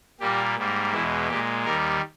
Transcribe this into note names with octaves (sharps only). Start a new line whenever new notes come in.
A#2 G3 A#3 G4
G#2 G3 A#3
E2 B2 G#3 E4
A#2 G#3 G4
D#2 D#3 G3 A#4